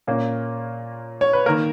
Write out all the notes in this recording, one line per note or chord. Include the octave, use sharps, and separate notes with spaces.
A#2 A#3 C#4
C#5
B4
D#3 A#3 A#4